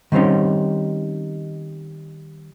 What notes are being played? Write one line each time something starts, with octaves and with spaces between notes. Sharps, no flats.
D#3 G3 C4 C#4 D#4